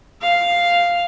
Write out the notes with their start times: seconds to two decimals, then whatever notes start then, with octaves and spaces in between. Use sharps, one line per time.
0.22 F5